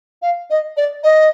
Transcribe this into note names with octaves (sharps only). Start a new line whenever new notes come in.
F5
D#5
D5
D#5